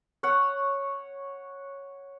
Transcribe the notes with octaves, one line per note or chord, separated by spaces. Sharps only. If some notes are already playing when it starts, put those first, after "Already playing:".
C#5 F#5